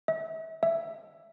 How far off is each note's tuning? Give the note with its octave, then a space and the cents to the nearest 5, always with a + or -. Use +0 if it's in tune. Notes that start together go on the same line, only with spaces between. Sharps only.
E5 -30
E5 +10